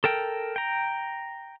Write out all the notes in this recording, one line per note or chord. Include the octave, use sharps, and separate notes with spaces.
A4 A#4 G5
G5 A#5